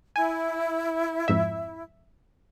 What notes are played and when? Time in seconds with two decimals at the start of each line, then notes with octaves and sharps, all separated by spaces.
0.16 E4 G#5
1.28 F2 G#2 E5